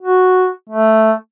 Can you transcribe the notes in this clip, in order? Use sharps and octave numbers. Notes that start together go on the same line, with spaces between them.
F#4
A3